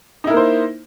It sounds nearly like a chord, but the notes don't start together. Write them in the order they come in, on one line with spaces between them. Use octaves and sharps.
D#4 E4 A#4 A#3 C5